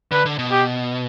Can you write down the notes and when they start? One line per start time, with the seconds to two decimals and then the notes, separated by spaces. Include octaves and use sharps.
0.12 D3 B4
0.26 D3
0.39 B2
0.52 G4